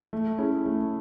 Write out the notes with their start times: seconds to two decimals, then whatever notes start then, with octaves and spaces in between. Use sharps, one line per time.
0.13 A3
0.38 C#4 E4 G#4
0.66 A3